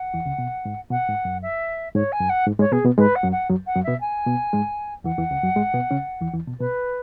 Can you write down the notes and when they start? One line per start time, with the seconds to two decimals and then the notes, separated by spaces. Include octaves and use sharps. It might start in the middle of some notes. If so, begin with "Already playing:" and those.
Already playing: F#5
0.14 E2 E3
0.26 C#2 C#3
0.39 B2
0.65 G#2
0.90 B2 F#5
1.08 G#2
1.25 F#2
1.42 E5
1.95 G#2 C#5
2.12 G#5
2.20 F#2
2.29 F#5
2.46 G#2
2.59 G#2 G#3 C#5
2.72 B2 B3 G#4
2.85 B2 B3
2.98 G#2 G#3 B4
3.15 F#5
3.23 F#2 F#3
3.32 F#5
3.50 F#2 F#3
3.67 F#5
3.75 F#2 F#3
3.84 B2 B3 E5
4.01 G#5
4.27 B2 B3
4.53 G#2 G#3
5.04 E2 E3 F#5
5.18 E2 E3
5.31 C#2 C#3
5.43 F#2 F#3
5.56 G#2 G#3
5.74 B2 B3
5.91 C#3 C#4
6.21 E2 E3
6.34 E2 E3
6.47 B2
6.60 B2 B4